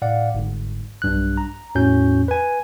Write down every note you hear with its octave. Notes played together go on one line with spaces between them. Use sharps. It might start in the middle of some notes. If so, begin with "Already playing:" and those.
A2 D5 F5 F#5
G1 G#2
B1 G2 F#6
A#5
E2 A2 C#4 F#4 G6
B4 G#5